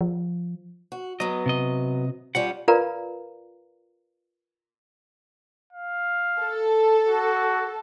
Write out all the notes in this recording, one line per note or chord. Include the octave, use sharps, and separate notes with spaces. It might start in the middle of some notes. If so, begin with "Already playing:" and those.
F3
F#4
F#3 B3 D#5
C3 D#5
G3 C#4 F4 F#5
F4 A#4 B4 D5 F5 A#5
F5
A4
F#4